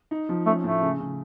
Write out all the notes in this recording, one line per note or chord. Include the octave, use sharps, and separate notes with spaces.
D#4
F3
A3 C#4
A2 A3
C#3
C#3